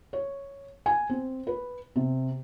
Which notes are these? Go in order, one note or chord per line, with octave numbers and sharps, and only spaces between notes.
C#5
G#5
C4
B4
C3